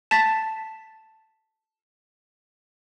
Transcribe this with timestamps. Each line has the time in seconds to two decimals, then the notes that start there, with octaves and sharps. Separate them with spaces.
0.11 A5 A6 B6 E7